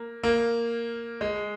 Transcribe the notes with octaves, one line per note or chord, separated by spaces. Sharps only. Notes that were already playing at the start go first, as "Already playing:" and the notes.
Already playing: A#3
A#3
G#3